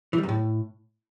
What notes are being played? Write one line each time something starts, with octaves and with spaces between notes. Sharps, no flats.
E3
G3
F#2
A2